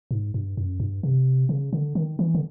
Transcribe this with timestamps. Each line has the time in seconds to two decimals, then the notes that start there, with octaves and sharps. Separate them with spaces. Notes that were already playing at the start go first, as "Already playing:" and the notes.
0.11 G#2
0.34 G2
0.57 F#2
0.80 G2
1.03 C3
1.49 C#3
1.73 D3
1.95 D#3
2.19 E3
2.35 D3